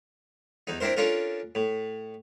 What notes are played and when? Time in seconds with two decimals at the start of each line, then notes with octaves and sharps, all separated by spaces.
0.67 E2 D#4
0.80 C4 D4 E4 A#4 C5
0.97 C#4 D4 F4 A4 A#4
1.55 A2